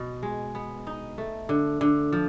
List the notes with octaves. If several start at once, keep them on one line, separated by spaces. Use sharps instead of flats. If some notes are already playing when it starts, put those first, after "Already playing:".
Already playing: B2 B3
G#3
B3
D#4
A3
D3
D3
F3